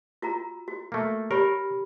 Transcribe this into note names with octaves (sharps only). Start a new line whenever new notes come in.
F4 F#4 A#5
F#4
A3 A#3
G4 A#4 C#5 B5